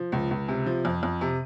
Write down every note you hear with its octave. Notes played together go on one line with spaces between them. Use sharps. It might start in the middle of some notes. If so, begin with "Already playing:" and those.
Already playing: F3
C#2
C#2
C3
F3
F2
F2
C3